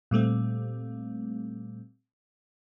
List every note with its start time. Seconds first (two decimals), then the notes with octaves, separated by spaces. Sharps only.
0.11 A#2 G3 A3 C4